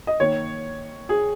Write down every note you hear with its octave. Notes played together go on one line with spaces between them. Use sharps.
D#5
D#3 A#3 C#5
G#4